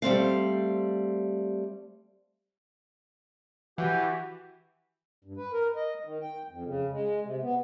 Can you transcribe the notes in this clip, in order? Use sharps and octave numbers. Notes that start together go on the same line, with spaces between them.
G3 A3 C4 F5
E3 F#4 G4
G2
B4
A#4
D#5
D#3
G5
F2
C#3
G#3
C3
B3